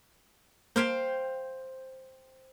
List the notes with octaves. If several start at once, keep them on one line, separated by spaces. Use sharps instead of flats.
A#3 C5 F5 G5 G#6 B6